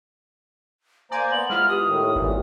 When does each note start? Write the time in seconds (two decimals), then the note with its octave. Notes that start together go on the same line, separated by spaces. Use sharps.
1.11 A#3 C5 D5 G#5 A#5
1.32 B3 F#7
1.50 G#3 E4 F4 F6
1.69 G4 D#6
1.87 A2 D#3
2.15 G#1 A#2 E3